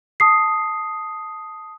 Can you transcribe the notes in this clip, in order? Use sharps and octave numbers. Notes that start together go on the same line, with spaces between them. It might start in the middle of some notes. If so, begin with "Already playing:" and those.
A5 D#6 C7